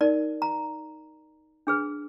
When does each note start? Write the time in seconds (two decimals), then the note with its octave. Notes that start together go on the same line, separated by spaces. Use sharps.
0.01 D#4 A#4 D5
0.42 A#5
1.67 D4 G#4 B4